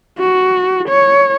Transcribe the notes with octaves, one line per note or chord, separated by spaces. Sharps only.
F#4
C#5